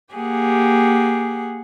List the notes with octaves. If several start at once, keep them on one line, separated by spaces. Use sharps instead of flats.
A#3 G4 G#4 F#5